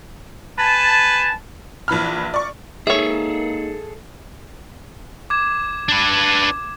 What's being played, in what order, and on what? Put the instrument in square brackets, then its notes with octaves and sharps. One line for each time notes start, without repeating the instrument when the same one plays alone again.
[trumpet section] B4 G#5 A5
[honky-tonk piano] A#1 E3 B5 F6
D5 C#6
[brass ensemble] G#3 A#3 D#4 [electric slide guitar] G#4 A4 [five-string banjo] C#5 E5
[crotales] D6 G#6 E7
[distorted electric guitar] D4 B4